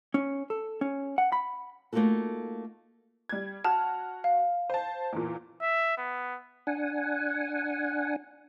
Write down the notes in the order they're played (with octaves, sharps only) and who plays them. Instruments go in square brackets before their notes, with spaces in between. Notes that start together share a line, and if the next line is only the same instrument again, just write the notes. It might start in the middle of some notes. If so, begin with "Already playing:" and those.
[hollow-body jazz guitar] C#4
A4
C#4
F#5
B5
[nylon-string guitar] A3 A#3 D#4 F4 F#4 A4
[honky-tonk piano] G3 G#6
[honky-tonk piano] F#4 F6 [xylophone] A5
[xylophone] F5
[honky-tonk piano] C5 A5
E2 A#2
[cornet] E5
B3
[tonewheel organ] D4 F#5 G#5